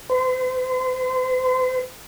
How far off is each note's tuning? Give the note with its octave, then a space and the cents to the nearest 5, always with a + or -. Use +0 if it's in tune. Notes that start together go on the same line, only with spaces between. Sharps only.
C5 -40